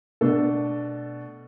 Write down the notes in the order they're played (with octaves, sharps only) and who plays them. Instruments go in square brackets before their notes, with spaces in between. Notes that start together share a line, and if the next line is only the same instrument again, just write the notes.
[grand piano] B2 A3 D4 A4